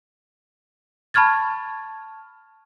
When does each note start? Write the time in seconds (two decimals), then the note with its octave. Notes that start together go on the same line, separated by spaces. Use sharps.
1.14 A5 B5 C#6 F6 G#6 A6